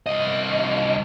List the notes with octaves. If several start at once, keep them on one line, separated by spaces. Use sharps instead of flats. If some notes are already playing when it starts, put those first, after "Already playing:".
C2 D#5